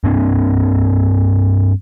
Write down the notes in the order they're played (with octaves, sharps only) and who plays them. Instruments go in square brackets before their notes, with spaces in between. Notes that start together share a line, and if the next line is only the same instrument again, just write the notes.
[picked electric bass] G2 A#3 C4 D4